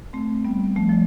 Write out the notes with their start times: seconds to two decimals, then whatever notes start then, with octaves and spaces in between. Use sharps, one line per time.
0.13 A3 C4
0.45 G3 B3
0.76 F3 A3
0.89 F3